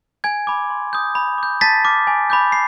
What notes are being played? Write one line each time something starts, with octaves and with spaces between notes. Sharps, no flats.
G#5 G#6
B5 D6
C6
D#6 G6
B5
D6 G6
A5 A6 B6
D6 F6
G#5
B5 D6 G6
C7